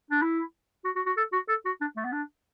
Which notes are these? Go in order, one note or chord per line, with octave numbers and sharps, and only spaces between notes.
D4
E4
F#4
F#4
F#4
A4
F#4
A4
F#4
D4
A3
B3
D4